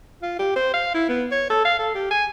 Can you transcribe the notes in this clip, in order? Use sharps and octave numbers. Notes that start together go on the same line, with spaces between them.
F4
G4
C5
F5
E4
B3
C#5
A4
F5
A4
G4
G#5